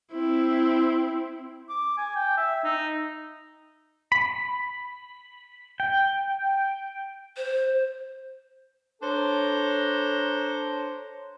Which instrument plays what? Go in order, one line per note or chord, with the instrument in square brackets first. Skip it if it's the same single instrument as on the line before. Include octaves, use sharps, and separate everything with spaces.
[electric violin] C4 E4
[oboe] D6
G#5
G5
E5
D#4
[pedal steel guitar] B5
G5
[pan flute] C5
[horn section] D4 A4 C5 C#5 A#5